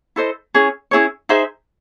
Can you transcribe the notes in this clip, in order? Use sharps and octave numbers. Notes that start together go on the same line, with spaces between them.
E4 A4 C5 D#5
C#4 E4 G#4 C#5
C#4 E4 G#4 C#5
D#4 G#4 C5 E5